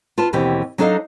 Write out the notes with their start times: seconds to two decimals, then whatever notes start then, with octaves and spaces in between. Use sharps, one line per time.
0.18 F4 B4 A5
0.33 D#2 B2 E3 C4 G4
0.78 F#3 D4 D#4 A4 D#5 F5